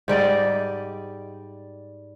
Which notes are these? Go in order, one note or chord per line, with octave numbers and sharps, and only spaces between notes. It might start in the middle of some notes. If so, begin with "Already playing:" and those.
G#2 G3 D5 D#5